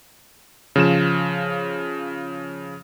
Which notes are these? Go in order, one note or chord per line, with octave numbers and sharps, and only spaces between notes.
C#3 F3 E7